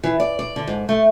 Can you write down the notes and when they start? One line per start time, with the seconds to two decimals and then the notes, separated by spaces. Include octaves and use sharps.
0.04 E3
0.20 D5
0.39 D5
0.56 D3
0.67 G#2
0.89 A3